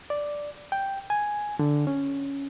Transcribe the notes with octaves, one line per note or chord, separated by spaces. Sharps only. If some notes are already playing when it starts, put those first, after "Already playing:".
D5
G5
G#5
D3
C#4